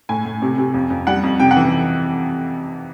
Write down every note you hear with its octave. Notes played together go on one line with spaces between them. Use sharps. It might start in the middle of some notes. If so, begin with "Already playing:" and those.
A2 G#5
A2
C3
C3
F2
F2
G3 F#5
F2
C3 G5
F#5
E3